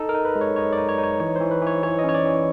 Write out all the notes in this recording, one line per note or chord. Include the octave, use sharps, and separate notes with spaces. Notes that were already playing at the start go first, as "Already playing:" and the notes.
Already playing: D#4 A4
A#4
D#4
B4
G#3
C#5
D#4 C#5
D5
D#4
C#5
D#4
C#5
E3 C#5
E3 C5
B4
E3 C#5
E3 C#5
D#5
C#4 C#5
D5
E3